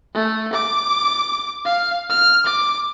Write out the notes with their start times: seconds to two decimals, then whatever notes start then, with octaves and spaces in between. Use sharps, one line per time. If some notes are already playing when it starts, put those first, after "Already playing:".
0.15 A3
0.53 D6
1.65 F5
2.10 F6
2.46 D6